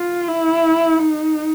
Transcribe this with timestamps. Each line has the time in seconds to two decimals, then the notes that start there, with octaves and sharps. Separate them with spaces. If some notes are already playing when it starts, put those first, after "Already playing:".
Already playing: F4
0.28 E4
0.99 D#4